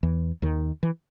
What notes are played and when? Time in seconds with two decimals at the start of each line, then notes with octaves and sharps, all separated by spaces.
0.03 E2 E3
0.42 D#2 D#3
0.83 E3